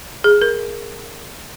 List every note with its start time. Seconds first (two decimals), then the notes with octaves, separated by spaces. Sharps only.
0.24 G#4
0.42 A#4